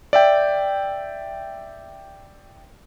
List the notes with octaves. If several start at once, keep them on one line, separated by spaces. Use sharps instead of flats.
D5 E5 G5